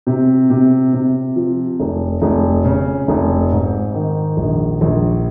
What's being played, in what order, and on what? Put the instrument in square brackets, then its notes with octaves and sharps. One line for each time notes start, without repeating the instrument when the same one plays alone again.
[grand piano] C3
C3
C3
F3
F1
F1
C#3
F1
G#2
D#3
A#1
A#1